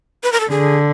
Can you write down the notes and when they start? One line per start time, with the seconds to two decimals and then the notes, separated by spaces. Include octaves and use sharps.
0.23 B4
0.32 A#4
0.40 A4
0.50 D3 G#4